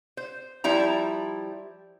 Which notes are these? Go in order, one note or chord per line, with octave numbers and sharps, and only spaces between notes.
C5
F3 G3 E4 A#5